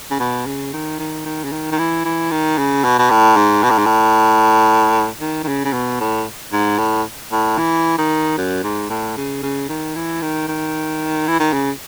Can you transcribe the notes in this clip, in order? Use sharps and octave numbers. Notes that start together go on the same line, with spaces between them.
C#3
B2
C#3
D#3
D#3
D#3
C#3
D#3
D#3
E3
E3
D#3
C#3
B2
B2
A2
G#2
B2
A2
G#2
A2
D#3
D#3
C#3
C#3
B2
A2
G#2
A2
A2
E3
D#3
F#2
G#2
A2
C#3
C#3
D#3
E3
D#3
D#3
E3
D#3
C#3